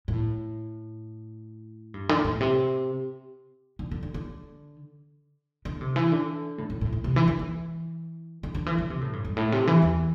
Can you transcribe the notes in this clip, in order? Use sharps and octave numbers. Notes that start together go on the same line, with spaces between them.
A2
G2
D3
A2
C3
D3
D3
D3
D3
D3
C3
E3
D3
A2
A2
A2
A2
C3
E3
D3
E3
D3
D3
E3
D3
C3
A2
G2
G2
A2
C3
E3
E2